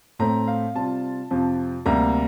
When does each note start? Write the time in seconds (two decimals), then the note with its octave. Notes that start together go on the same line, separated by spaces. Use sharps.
0.19 A2 A3 C4 A#5
0.47 F5
0.75 C3 G3 C4 F4 A5
1.30 F2 C3 F3
1.86 D2 C3 G3 A#3 A#5